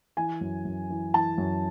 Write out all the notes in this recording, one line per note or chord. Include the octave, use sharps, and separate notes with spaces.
E3 G#5
F#2
F#2
E3
E3 A5
F#2